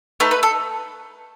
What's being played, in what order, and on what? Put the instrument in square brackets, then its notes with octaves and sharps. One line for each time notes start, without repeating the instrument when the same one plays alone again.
[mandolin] A3 D#4 A4 B4
B4
A4